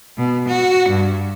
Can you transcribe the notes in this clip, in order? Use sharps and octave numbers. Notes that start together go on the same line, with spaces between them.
B2
F#4
G2